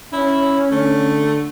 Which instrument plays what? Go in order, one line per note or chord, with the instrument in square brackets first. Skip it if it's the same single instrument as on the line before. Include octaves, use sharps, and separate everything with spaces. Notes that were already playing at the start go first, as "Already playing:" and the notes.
[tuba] C#4 [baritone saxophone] E4
[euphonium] D3 [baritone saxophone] A3